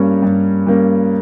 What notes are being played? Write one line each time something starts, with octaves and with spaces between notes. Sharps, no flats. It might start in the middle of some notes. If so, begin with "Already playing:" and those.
Already playing: G2 G3 A#3 C#4
G2
G3 A#3 C#4